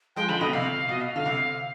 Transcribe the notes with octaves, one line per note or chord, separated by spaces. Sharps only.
F3 G#3 G5
D3 F3 B5
B2 D3 D#5
C3 F5
B2 D#5
F5
D3 F5
C3